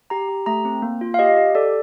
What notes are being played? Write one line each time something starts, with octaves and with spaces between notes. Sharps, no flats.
G4 A#5
G4
A3 A#5
C4
A#3
F4
F5
G4 D#5
G4
A4 D5